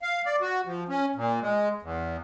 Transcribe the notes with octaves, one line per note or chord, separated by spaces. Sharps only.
F5
D5
F#4
F3
C#4
A#2
G#3
E2